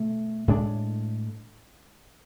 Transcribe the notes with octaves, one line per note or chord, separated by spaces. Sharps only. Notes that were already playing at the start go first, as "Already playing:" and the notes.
Already playing: B2 A3
A2 G#3 D4